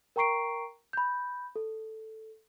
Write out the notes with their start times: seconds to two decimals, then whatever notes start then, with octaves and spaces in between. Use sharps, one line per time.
0.16 A#4 G5 A#5 C#6 C7 D7
0.93 B5 G6
1.56 A4